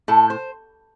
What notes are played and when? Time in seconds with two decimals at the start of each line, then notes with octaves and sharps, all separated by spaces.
0.08 A2 A4
0.30 C5